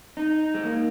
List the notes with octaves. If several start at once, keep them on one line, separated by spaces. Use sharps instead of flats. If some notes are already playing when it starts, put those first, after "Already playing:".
D#4
G#3
A#3